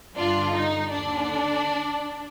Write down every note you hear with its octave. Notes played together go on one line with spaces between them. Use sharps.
G2 D3 D4 F4
D#4
D#2 D3 D4